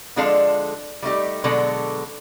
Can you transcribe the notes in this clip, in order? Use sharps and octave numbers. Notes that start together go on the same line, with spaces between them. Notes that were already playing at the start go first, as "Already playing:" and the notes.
D3 F3 G#3 D4 A4 F5
G3 A3 D#4 G4
B2 D3 F#3 G#3 A4 D5